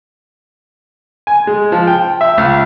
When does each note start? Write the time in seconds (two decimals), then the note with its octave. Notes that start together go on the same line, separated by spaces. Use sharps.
1.27 G#5
1.47 G#3
1.72 F3
1.87 G5
2.21 E5
2.38 C#2